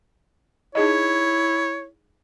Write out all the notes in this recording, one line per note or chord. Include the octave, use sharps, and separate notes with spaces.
D#4 E4 G#4 C#5 D#5